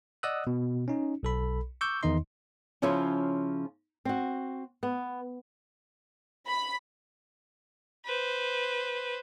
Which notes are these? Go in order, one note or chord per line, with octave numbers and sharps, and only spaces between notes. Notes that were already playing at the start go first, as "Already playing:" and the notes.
D5 D#5 F#5 D#6 E6 F#6
B2
C#4 D#4
B1 A4 B5
C#6 D6 E6 G6
E2 D#3 D#4 D#5 C6
C#3 F3 C#4 E4 F4 C#5
C4 F#4
B3
B5
B4 C5